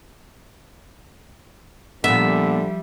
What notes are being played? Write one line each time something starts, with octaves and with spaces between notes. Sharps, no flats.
A#2 D3 F3 G3 B3 E5